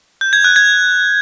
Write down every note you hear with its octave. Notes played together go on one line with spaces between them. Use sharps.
G6
G#6
F#6
G#6